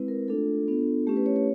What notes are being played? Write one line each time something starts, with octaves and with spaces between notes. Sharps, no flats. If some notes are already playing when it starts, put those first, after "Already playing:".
Already playing: G#3 C4 E4 B4
A#4
A3 D4 F4 A4
B3 D4 F4
A3 C#4 E4 G4
B4
C#5
C#5